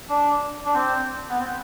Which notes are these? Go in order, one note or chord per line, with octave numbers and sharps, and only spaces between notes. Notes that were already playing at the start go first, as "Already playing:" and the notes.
D4
D4
C4
B3
C4